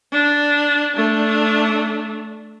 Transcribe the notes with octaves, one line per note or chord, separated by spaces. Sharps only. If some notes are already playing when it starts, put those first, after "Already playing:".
D4
A3 D4